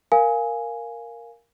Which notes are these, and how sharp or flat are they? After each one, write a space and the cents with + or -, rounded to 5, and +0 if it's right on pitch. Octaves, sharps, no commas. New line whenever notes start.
A#4 +0 F5 +0 G#5 +0